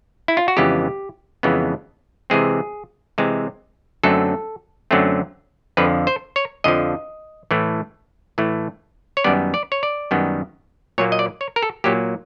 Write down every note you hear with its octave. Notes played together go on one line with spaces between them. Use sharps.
E4
F4
F#4
F2 C#3 E3 G#3 B3 G4
F2 C#3 E3 G#3 B3
C3 E3 G#3 C4 G#4
C3 E3 G#3 C4
F#2 D3 F#3 A3 C4 A4
F#2 D3 F#3 A3 C4
F2 D3 F3 B4
C5
C#5
F2 D3 F3 D#5
A2 E3 A3
A2 E3 A3
C#5
F#2 D#3 G3 B3 D5
D5
C#5
D5
F#2 D#3 G3 B3
A#2 F#3 A#3 C#5
D#5
D5
C#5
A#4
A4
A#2 F#3 A#3 G4